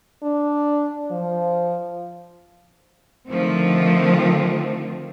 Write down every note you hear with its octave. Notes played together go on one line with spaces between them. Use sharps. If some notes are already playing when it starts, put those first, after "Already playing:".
D4
F3
D3 D#3 F3 A3 C4